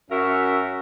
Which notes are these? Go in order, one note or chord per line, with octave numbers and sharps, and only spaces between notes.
F#2 C#4 F#4 A#4 E5